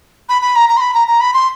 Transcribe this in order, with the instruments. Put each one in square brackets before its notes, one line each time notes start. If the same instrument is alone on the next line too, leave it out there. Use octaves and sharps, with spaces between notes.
[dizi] B5
B5
A#5
A#5
C6
B5
A#5
A#5
B5
C6